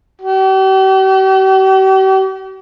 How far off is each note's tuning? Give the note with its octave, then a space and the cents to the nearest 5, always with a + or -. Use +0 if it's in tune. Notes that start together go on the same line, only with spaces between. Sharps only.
G4 -45